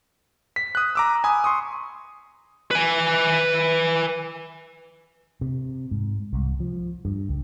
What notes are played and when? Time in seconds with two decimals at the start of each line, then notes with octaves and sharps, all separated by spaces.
0.56 B6
0.75 D#6 F#6
0.95 A#5 D6 E6
1.24 G#5 B5 D#6
1.44 C6 C#6 D#6
2.71 B4 G#5
5.41 C3
5.91 G#2
6.33 C2
6.60 F3
7.05 G2
7.29 C#2